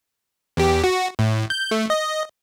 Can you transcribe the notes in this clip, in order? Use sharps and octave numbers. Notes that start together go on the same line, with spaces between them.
E2 G4
F#4
A2
G6
A3
D#5